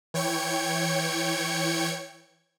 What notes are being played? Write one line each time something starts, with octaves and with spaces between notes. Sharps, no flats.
E3 C#5 G5 G#6 C#7